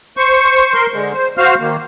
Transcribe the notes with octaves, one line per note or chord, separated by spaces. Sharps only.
C5 C#6
A#4 C6
D3 G#3
C5
F#4 C5 F5 F6
D#3 A#3